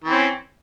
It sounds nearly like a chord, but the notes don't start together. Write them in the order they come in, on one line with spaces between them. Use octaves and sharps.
E3 C4 C#4